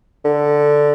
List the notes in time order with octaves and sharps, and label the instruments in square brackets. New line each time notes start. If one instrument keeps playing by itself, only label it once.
[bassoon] D3